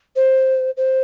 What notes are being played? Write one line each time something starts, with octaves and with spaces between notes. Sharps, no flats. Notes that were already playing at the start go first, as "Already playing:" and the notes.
C5
C5